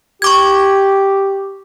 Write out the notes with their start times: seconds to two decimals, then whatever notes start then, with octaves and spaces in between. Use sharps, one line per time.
0.22 G4 C#6 D6 G#6